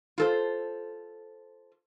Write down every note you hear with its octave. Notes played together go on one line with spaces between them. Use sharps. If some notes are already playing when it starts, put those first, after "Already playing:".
F4 A4 C5